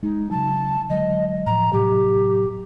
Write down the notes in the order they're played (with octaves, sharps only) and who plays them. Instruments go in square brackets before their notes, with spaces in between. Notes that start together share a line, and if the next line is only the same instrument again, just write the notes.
[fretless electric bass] G#3 [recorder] D#4
[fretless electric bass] C#3 F#3 [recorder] A5
[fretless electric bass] D3 F#3 G#3 [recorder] D#5
[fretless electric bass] A2 F3 [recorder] A#5
[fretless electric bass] A2 C3 F#3 [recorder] G4